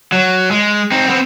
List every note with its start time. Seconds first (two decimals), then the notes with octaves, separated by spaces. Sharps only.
0.12 F#3
0.51 G#3
0.92 C4 D#4
1.08 B3 C4